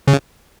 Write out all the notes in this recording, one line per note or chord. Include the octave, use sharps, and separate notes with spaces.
C#3